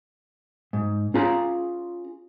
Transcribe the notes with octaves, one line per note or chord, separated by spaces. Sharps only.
G#2
C#4 F4 G#4 A#5